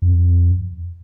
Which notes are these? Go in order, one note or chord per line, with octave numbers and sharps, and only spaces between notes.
F2